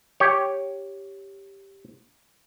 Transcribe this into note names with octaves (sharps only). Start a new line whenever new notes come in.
G4 C#5